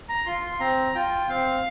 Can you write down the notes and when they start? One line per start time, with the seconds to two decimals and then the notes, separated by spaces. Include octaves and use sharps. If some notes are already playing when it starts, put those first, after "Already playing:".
0.09 A#5
0.26 F4 C6
0.43 C6
0.54 C6
0.60 C4 A#5
0.95 F4 G5
1.29 C4 F5